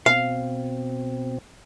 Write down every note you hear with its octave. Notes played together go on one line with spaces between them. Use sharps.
B2 C4 F5